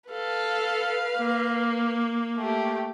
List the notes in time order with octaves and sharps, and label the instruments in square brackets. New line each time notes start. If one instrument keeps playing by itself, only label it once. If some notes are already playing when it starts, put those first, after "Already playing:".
[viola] A4 [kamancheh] B4 F5
[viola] A#3
[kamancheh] A3 G4